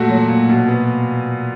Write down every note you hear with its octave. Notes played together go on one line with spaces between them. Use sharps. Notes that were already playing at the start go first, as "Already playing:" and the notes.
Already playing: A#2 A3 F#4 F#5
F#3
A#2
B2
B3